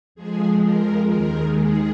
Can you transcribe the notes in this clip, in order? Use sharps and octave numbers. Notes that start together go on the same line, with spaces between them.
F2 F3 G#3 G#4
A#4
D#2 D#3 G#3 A#4
G#4